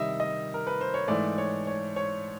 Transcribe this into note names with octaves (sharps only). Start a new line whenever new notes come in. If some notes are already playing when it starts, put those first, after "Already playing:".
Already playing: C3 D#3 G3 D#5 E5
D#5
A#4
B4
C5
C#5
G#2 E3 A3 D5
C#5
C#5
C#5